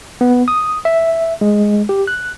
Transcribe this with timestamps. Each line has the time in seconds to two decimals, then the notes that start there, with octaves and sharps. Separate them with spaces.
0.21 B3
0.48 D#6
0.85 E5
1.41 G#3
1.89 G4
2.07 F#6